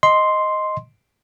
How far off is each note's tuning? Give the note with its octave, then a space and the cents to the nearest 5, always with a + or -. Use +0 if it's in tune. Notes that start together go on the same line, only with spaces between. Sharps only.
D#5 +0 C6 +0